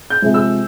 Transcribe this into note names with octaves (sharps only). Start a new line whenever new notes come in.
G6
C3 F3 G#3
E6